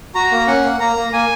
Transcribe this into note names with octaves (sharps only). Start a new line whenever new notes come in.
F#4 A#5
A#3
C#4 F#5
A#3
A#3 A#5
A#3
A#3 G#5